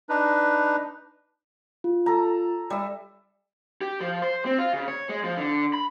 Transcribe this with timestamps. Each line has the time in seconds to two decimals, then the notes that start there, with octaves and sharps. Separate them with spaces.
0.09 D4 D#4 B4
1.84 F4
2.06 A4 A#5
2.70 G3 E5
3.81 G4
4.01 F3
4.22 C5
4.45 C4
4.58 F4
4.73 C#3
4.88 C#5
5.09 G#3
5.24 F3
5.37 D3
5.73 B5